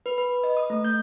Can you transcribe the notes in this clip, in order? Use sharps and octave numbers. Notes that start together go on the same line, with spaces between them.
B4
B4
D#5
D#6
A3
G6